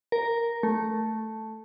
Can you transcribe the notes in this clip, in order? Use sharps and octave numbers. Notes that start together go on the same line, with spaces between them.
A#4
A3